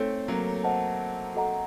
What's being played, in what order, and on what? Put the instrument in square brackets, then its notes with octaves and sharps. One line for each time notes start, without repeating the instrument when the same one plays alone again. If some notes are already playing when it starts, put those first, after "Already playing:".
Already playing: [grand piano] A3 C4 [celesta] D#4 A4 C#5
[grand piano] F#3 A#3
[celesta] C5 D#5 F#5 A5
F#4 A4 D#5 F#5 A#5